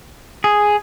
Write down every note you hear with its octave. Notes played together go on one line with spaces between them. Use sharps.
G#4